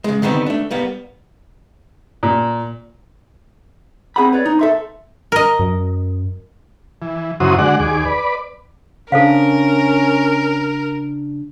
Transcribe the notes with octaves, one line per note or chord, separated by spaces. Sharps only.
C#3 G#3
D3 D#3 G3 B3 C4
A3 D4
G3 A#3 B3
A#2
C4 G#4 F#5 B5
B4 C#5 D5
D#4
A4 E5 C6
A#4 D#5
F#2
E3
F#2 C#3 E4 F#4 C5 D#6
D3 G#3 F#4 D5 F#5
D#2 G#4 D6
B4 D5
C#3 C#4 D4 A4 A#4 C5 F5